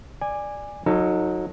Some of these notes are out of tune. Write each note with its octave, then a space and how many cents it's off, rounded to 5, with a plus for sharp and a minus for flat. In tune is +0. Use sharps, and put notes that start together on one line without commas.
D5 +10 G#5 -15
F#3 -25 D#4 +0 A4 +25